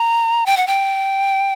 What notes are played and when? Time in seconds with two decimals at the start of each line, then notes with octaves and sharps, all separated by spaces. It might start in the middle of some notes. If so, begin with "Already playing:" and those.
Already playing: A#5
0.46 G5
0.57 F#5
0.67 G5